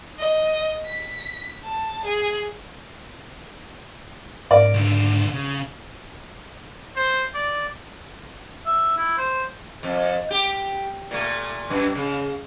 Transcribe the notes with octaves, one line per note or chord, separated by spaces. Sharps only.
D#5
B6
A5
G#4
G#2 A#4 D5
C#2 D3
C#3
C5
D5
E5
E4
C5
F2
G4
A#2 A3
F#2
C#3